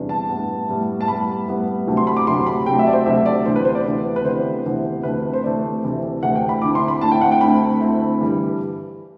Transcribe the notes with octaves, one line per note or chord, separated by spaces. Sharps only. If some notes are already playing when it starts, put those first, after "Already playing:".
Already playing: E2 C3 G3 D4
A5
A2 G3 B3
A2 G3 B3
A5
A2 G3 B3 B5
A2 G3 B3
D2 C3 F#3 A3
C6
B5
D6
D2 C3 F#3 A3 C6
B5
D2 C3 F#3 A3 G5
E5
D5
C5
D2 C3 F#3 A3 E5
D5
D2 C3 E3 B3 C5
B4
C5
D5
D2 C3 E3 B3
B4
D2 C3 E3 B3 C5
D2 C3 E3 B3
D2 C3 E3 A3 C4 B4
C5
D2 C3 E3 A3 C4 D5
D2 C3 E3 A3 C4
D2 C3 E3 A3 C4 F#5
G5
B5
D2 D3 A3 C4 E4 D6
C6
B5
D2 D3 A3 C4 E4 A5
G5
F#5
G5
D2 D3 A3 C4 E4 B5
D2 D3 A3 C4 E4
G2 E3 G3